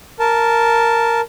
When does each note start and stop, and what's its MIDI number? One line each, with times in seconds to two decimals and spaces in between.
0.19 1.21 70
0.19 1.21 81